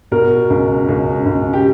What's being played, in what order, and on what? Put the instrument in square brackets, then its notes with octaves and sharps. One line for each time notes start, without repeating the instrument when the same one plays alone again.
[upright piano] B2 A#4
C#2
C#2
C#2
G4